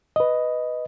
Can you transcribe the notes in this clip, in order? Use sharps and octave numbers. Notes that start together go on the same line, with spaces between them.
B4 D#5